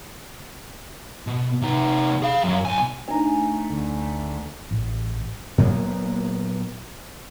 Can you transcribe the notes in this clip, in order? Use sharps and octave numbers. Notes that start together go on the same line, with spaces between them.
B2
C3 D#4
G#4 F5
F#2 F#3
B1 G#5
A3 D4 D#4 G#5 A#5
D2
A1
A#2 F#3 A#3 B3